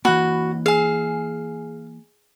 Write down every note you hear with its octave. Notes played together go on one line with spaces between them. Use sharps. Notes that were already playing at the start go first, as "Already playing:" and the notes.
E3 A#3 F#4 B5 F#6
G#4 F5 G#5